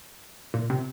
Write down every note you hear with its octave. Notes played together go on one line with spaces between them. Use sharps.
A#2
C3